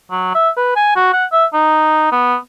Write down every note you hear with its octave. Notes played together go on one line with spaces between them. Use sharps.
F#3
E5
B4
G#5
F#4
F#5
E5
D#4
B3